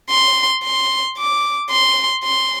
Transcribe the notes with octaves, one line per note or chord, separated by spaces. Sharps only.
C6
C6
D6
C6
C6